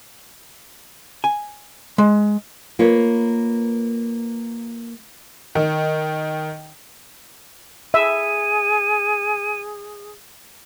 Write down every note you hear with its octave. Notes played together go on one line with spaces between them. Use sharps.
G#5
G#3
A#3 F4 B4 C#5
D#3
G#4 E5 D#7